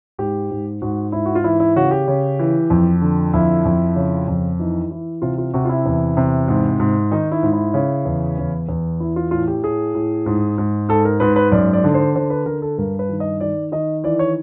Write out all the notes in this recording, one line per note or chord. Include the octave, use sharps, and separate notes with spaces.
G#2 G4
G#2
G#2 F#4
G#2 E4
F#4
F4
E3 E4
E4
C#3 F#4
G4
C#3
E3
F2
D3
F2 E4
F2
C#3
F2
E3 D#4
E3 E4
C3 F4
F4
C3 F#4
F4
E4
E2
C3
G#2
G#2
D#3 D#4
E4
G#2
E4
C#3
E2
E2
E2
E3 E4
F4
A2 F4
G4
A2 G#4
A2
G#2
G#2
G#2 A4
A#4
G#2 B4
B4
F#2 D5
D5
D3
C5
D3 C5
B4
D3 A#4
A4
G2 A#4
B4
D#3
D#5
D#3 D5
D#3 D#5
E3 D5
C#5